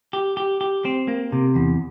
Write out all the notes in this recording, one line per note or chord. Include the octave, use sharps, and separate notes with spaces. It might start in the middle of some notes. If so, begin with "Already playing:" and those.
G4
G4
G4
C4
A#3
C3
E2